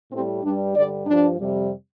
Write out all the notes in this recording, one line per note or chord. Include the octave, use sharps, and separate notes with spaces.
A2 G3 C4
G2 G3 D4
G2 D3 G3 D5
G2 F3 D4
F2 C3 G3